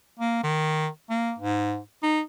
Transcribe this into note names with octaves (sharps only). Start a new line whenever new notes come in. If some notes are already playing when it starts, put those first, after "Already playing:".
A#3
D#3
A#3
G#2
D#4